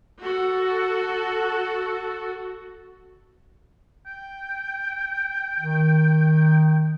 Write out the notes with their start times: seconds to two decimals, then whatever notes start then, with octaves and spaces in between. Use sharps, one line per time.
0.21 F#4 A4
4.06 G5
5.60 D#3